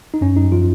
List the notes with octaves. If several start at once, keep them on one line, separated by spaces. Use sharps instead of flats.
D#4
F#2 C#4
F#2 D#4
F3 F4